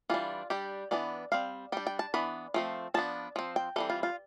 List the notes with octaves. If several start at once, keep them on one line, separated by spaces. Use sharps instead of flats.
E3 G3 D4 F4
G3 D4 G4
E3 B3 D4 D5
G3 C4 F5
G3 D4 G5
G5
A5
E3 B3 D4 B5
F3 A3 C4
F3 B3 D4 A5
F3 C4
G5
E3 G3 C4 A4
F4
F4